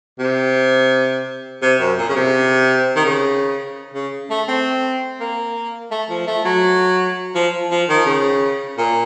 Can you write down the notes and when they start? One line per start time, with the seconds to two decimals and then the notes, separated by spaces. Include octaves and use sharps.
0.19 C3
1.62 C3
1.80 F#2
1.98 A#2
2.09 C#3
2.16 C3
2.96 D#3
3.05 C#3
3.95 C#3
4.31 A3
4.48 C4
5.20 A#3
5.92 A3
6.10 F3
6.27 A3
6.45 F#3
7.35 F3
7.71 F3
7.89 D#3
8.06 C#3
8.78 A#2